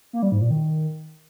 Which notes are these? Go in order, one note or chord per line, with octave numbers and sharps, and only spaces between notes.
A#3
G3
G#2
A#2
D#3